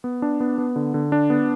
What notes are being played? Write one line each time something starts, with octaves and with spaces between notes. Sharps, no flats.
B3
D4
B3
B3
D3
D3
D4
B3